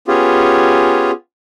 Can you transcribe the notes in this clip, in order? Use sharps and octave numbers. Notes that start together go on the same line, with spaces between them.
B3 C#4 F4 G4 G#4